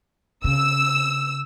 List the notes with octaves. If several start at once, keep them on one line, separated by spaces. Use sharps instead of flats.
C#3 E6